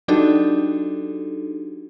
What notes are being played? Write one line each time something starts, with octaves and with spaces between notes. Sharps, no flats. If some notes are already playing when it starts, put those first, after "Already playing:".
F#3 D4 D#4 F#4 G4 A4